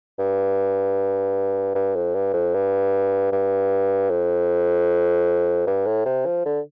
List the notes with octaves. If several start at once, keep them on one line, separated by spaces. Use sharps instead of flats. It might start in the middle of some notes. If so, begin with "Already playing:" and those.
G2
G2
F2
G2
F2
G2
G2
F2
G2
A2
C3
F3
D3